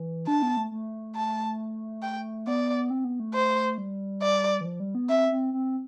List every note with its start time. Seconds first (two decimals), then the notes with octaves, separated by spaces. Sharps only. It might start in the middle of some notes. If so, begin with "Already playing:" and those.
Already playing: E3
0.27 D4 A5
0.42 B3
0.57 A3
0.72 A3
1.16 A5
2.02 G5
2.47 B3 D5
2.90 C4
3.05 B3
3.20 A3
3.34 C5
3.78 G3
4.22 D5
4.61 E3
4.65 F3
4.80 G3
4.95 B3
5.09 C4 E5
5.32 C4
5.53 C4